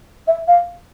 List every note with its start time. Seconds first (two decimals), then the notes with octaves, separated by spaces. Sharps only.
0.27 E5
0.48 F5